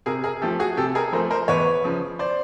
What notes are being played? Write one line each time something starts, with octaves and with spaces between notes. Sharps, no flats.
C3 G#4 A#4
G#4 A#4
F3 A3 G4 A4
F#4 G#4
C3 G4 A4
G#4 A#4
F3 A3 A#4 C5
A#4 C5
E2 B4 C#5
C#3 F3
C5 D5